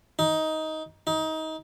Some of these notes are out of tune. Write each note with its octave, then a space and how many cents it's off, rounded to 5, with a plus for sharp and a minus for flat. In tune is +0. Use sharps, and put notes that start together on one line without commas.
D#4 +15
D#4 +25